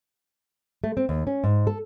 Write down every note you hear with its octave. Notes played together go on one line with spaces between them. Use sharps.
A3
C4
D#2
C#4
G#2
A4